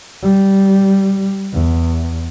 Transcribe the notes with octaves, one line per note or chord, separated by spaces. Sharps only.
G3
E2